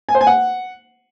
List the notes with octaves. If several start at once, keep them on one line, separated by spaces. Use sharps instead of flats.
G#5
C5
G#5
F#5